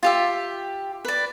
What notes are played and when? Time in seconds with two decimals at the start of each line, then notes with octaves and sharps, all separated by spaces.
0.03 F4 G4 E5
1.05 B4 D5